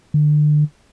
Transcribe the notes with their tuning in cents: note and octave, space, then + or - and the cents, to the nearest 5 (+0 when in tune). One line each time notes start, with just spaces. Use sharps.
D3 +30